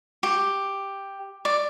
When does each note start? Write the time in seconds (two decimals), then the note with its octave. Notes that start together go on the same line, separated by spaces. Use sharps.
0.23 G4
1.45 D5